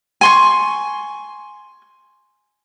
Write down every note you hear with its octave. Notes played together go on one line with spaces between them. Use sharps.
G#5 C6 C#6